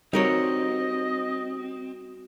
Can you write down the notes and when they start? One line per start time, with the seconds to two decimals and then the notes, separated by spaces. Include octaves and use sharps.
0.13 G3 C4 D#4 F#4 A#4 C#5 D#5